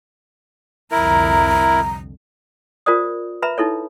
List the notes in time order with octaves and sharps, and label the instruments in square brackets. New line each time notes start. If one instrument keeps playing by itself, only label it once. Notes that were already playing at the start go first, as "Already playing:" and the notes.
[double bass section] C2 F2 D3 [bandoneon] E4 A#4 [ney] A#5
[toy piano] F4 A#4 C5 D5 D#6
B4 E5 A#5 B5
D#4 E4 A4 C#5